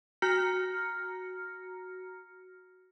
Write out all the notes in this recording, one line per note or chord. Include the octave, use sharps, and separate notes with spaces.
F#4 A#5 F6 A#6 C#7